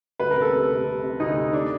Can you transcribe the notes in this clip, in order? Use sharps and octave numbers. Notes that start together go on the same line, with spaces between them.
D2 B4
C3 A#4
A4
C3
C3
C3
C3
D2 D#4
C3
D4